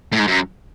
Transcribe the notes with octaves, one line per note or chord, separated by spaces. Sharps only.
A2
G#2
F#2